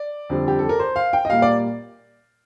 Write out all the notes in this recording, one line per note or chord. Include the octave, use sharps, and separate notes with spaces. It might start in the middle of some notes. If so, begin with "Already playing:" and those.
Already playing: D5
F2 D3 G3
G4
A4
A#4
C5
F5
G5
D#5
A#2 G3 A#3 F5
D5